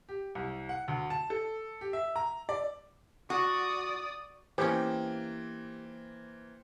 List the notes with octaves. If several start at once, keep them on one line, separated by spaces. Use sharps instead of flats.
G4
C2
F#5
D2
A5
A4
G4
E5
A#5
D5
F#4 D5 D#6
E3 A#3 B3 C#4 G4 C5 G5